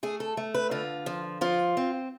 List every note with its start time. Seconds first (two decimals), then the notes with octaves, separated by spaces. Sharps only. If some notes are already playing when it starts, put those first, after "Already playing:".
0.03 A3 G#4
0.20 A4
0.37 A3
0.54 B4
0.71 D3 F4
1.06 F3
1.41 F3 F4
1.77 C4